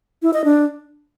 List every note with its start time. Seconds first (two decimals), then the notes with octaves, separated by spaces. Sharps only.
0.22 E4
0.33 D#5
0.45 D4